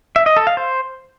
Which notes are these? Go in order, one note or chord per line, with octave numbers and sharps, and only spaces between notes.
E5
D#5
A4
F5
C5